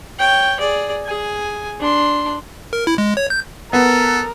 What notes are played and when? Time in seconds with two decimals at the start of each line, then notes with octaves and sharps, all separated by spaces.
0.19 C#5 G5
0.60 G#4 D5
1.06 G#4 G#5
1.80 D4 C6
2.73 A#4
2.87 E4
2.98 G#3
3.17 C#5
3.30 G6
3.73 B3 A4 A#4